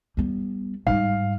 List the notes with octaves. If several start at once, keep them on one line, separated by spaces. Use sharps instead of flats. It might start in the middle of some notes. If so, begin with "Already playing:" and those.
G3 B3
G#2 G3 F5